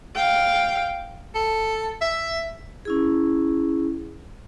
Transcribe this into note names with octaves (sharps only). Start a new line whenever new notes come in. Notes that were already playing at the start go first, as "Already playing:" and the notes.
F5 G5
A4
E5
C#4 E4 G#4